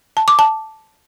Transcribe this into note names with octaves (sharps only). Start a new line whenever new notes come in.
A5
D6
A5